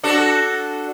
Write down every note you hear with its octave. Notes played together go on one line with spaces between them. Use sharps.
D4 F#4 A4